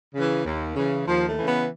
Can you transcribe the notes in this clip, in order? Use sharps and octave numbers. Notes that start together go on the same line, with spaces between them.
C#3 E3
D#2
C#3 E3
D#2 F3
A3
C#3 E3
B3